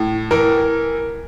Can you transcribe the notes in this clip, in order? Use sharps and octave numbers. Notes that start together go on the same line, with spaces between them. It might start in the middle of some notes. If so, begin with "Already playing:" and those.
Already playing: A2
E3 A#4